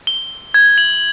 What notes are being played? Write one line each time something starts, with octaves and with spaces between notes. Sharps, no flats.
G7
G#6
F#7